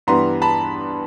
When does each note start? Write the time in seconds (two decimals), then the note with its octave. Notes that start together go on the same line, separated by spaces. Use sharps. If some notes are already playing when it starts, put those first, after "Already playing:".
0.07 G2 E3 G3 B3 A#5 C6
0.42 A5 B5